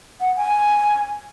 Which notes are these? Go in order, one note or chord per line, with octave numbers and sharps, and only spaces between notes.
F#5
G#5